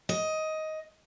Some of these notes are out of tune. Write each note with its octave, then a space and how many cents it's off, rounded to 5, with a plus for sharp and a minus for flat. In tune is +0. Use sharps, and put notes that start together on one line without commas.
D#5 +10